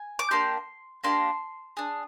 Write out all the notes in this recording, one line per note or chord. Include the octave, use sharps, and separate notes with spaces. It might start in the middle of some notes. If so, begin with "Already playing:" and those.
Already playing: G#5
D6
A#3 D4 G4 C6
A#3 D4 G4 C6
D4 G#4